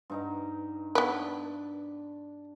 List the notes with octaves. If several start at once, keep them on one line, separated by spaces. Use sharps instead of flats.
G2 D#4 A#5
B3 D4 B4